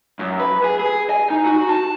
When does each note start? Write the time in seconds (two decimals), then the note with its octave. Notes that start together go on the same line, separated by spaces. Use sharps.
0.19 F#2
0.39 B4
0.64 G#4
0.79 G#4
1.10 G#5
1.30 D#4
1.45 F#4
1.69 A5